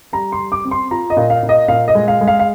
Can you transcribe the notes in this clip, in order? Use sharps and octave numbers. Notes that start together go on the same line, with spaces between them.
G3 A#5
C6
G3
D6
C4
C6
F4 A#5
D#5
A#2
F5
A#2
D#5
A#2 F5
D#5
G#3
F5
G#3
F5
F5